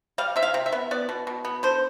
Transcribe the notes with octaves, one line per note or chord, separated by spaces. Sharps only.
G3 F5
C3 E5
F5
C3
E5
B3
B3 D5
B2
B2
B3
D3 C5